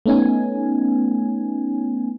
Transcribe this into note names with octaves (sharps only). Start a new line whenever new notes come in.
A3 B3 C#4 D#4 G#5